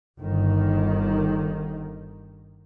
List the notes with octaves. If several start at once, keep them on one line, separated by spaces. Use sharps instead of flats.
G1 D#3